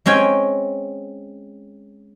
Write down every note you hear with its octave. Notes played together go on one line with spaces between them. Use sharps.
G#3 C4 C#4 G5 G#5